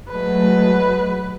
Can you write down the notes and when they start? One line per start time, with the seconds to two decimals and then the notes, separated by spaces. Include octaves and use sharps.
0.10 F#3 G#3 A3 B4